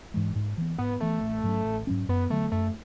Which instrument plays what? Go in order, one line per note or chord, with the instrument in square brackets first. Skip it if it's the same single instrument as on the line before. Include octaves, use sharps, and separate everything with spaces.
[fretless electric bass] G#2 E3 G#3
G#2
E3 B3
[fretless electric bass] G#2 [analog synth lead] B3
[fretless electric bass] E3 B3 [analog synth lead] A3
[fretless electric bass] A1
G#2 F#3 C#4
A1
G#2 F#3 C#4
[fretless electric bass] F#2 [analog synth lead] B3
[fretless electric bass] D3 F#3 B3 [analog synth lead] A3
[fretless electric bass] F#2 [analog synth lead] A3